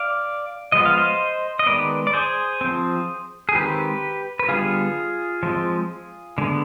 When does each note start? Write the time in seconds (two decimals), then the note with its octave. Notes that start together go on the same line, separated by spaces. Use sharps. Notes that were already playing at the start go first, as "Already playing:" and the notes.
Already playing: D5 F5
0.72 F3 G#3 B3 D#5
0.86 F5
0.98 C5 D#5
1.59 D#5
1.66 D#3 G#3 B3 B4 D5
2.07 D5
2.13 G#4 C5
2.61 F3 C4
3.49 G#4
3.55 D#3 G#3 C4 G4 B4
4.39 B4
4.49 D3 G3 B3 F4 G#4
5.43 F3 G#3 C4
6.38 D3 G#3 B3